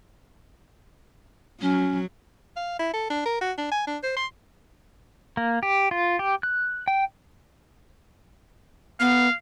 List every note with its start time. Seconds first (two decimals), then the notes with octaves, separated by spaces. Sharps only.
1.61 F#3 C#4
2.56 F5
2.79 E4
2.94 A4
3.10 D4
3.26 A#4
3.41 F#4
3.58 D4
3.72 G#5
3.87 D4
4.03 C5
4.16 C6
5.37 A#3
5.63 G4
5.91 F4
6.19 G4
6.43 F#6
6.88 G5
9.00 B3 F5